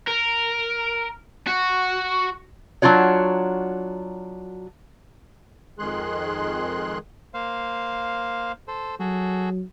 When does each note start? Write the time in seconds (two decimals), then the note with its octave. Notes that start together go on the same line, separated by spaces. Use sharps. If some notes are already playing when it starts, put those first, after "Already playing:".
0.08 A#4
1.47 F#4
2.82 F#3 D4 F4 F#4 C#5
5.79 F2 D#3 G#3 G#4 C6 F#6
7.34 A#3 C5 F5
8.68 A4 C5
9.00 F#3 F#4 G#4 A4